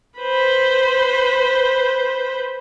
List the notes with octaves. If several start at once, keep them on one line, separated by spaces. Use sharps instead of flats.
B4 C5